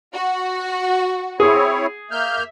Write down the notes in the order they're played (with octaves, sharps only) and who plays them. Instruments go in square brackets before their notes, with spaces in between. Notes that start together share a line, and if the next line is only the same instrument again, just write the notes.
[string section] F#4
[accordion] C4 E4 C#5 [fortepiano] G#4
[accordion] A#3 F6 G6 [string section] E5